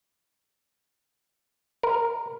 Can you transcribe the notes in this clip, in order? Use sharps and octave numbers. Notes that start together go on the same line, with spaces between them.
A#4